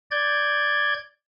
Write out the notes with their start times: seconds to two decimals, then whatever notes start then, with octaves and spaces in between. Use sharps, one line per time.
0.11 D5 G6 G#6